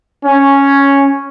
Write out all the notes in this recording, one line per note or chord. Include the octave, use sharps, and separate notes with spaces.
C#4